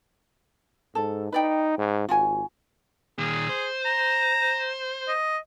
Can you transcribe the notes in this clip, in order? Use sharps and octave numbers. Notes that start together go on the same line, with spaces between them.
G#2 A4
D#4 B4 D5 G5
G#2
G#1 F4 F#4 G#5
A#2 D#3 G#4
C5
A#5
D#5